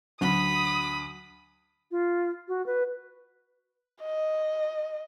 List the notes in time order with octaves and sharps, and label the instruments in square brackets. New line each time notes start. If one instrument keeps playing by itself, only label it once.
[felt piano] D2 [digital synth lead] F#3 [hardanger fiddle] B5 [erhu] D#6
[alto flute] F4
F#4
B4
[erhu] D#5